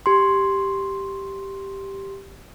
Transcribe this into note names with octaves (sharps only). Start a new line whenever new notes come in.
G4 C6